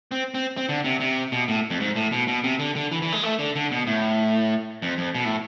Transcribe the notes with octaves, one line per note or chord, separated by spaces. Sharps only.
C4
C4
C4
D3
C3
C3
B2
A2
F2
G#2
A2
B2
B2
C3
D3
D3
E3
E3
G#3
A3
D3
D3
B2
A2
F2
F2
B2
A2